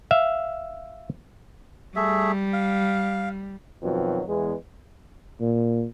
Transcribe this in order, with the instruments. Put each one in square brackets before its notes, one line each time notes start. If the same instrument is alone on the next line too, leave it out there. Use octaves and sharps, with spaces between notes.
[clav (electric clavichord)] E5 F5
[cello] G3 [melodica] A3 G#4 E5
[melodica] F5
[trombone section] F2 B2 D#3 F#3
E2 G#3
[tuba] A#2